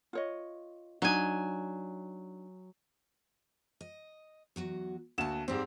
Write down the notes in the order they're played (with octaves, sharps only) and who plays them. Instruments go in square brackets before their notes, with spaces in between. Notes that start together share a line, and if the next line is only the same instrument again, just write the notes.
[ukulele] F4 C#5 D#5
[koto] F#3 G#5 [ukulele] D4 D#4
[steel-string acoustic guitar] D#5
E2 F#3 F#4
[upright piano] D2 F#4 E7 [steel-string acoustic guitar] A#3 A5
[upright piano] G#2 G3 C4 [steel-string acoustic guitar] G4 D5